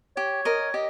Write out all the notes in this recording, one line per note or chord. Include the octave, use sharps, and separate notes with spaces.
G4 C#5
A#4 D#5
G4 D#5